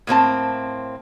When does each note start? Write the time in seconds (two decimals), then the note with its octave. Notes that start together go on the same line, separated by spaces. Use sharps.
0.07 A2 A#3 C4 A5